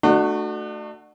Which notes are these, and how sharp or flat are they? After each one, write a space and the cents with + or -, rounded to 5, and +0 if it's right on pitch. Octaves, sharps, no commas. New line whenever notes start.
A3 +0 D4 +40 F#4 +0